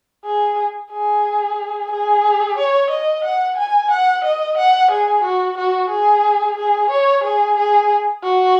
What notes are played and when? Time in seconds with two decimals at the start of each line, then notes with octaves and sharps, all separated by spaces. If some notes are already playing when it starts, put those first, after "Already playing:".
0.25 G#4
0.91 G#4
1.91 G#4
2.58 C#5
2.90 D#5
3.24 F#5
3.57 G#5
3.91 F#5
4.24 D#5
4.58 F#5
4.91 G#4
5.24 F#4
5.58 F#4
5.90 G#4
6.57 G#4
6.90 C#5
7.24 G#4
7.57 G#4
8.23 F#4